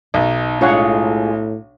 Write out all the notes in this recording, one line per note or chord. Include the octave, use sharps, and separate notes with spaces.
B1 D#4
A2 G#3 D4 F4 G#4 C#5 F#5